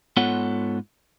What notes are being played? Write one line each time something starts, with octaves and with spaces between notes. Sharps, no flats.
G#2 B3 F4 A4 C#5 F#5